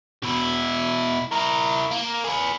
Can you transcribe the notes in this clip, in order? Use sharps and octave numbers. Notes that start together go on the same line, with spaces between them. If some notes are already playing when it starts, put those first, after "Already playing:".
B2 E4
E4 A#4
A#3
G#4 B4